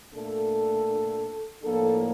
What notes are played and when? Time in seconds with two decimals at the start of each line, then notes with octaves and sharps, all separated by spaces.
0.14 A#2 A3 D4 A4
1.63 A2 F3 A#3 D4 A4